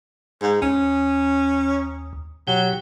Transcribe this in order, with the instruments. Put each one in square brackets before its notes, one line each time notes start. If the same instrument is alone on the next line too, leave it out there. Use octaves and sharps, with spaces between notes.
[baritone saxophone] G#2
[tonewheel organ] D#2 [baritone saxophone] C#4
[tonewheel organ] B2 G4 G5 [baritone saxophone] F#3